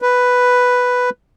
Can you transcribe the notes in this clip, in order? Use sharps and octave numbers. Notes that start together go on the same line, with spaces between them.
B4